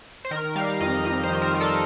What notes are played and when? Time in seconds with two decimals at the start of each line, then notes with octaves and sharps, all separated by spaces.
0.25 C5
0.31 D#3 A#4
0.56 G3 F5
0.70 F5
0.80 F2 D#5
1.05 F2 D#5
1.23 C5
1.30 D#3
1.42 A#4
1.54 G3
1.61 A4